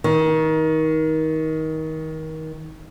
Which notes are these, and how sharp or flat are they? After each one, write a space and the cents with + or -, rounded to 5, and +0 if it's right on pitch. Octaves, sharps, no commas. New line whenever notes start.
D#3 +25